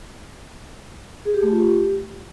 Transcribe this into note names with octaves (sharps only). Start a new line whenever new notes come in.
G#4
G4
A3
F4
G4